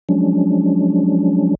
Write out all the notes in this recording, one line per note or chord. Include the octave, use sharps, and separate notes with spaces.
F3 F#3 G#3 C#4 D4